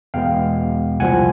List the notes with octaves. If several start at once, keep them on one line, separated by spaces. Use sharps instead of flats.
E2 B2 G#3 B3 F5 G5
C2 A#2 F3 F#5 G#5